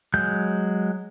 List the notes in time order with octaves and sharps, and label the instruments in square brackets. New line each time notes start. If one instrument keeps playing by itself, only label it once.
[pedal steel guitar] F#3 G#3 G6